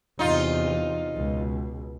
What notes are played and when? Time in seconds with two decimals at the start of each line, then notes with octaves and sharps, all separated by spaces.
0.19 E2 C3 D#4 F4
1.16 C#2 B2